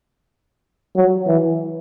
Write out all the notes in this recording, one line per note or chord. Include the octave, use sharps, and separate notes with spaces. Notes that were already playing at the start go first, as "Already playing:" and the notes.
F#3
E3